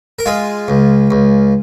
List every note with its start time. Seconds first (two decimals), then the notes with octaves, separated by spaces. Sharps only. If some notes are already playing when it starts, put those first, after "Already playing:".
0.19 A#4
0.26 G#3 F4 G#4
0.68 C#2
1.11 C#2